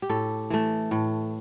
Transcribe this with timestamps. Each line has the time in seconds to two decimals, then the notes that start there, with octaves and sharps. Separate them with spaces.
0.02 G4
0.09 A2 A4
0.50 E3 A3
0.91 A2